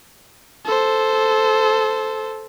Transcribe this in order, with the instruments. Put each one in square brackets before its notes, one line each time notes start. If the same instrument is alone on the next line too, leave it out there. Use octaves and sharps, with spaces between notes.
[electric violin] A4 C5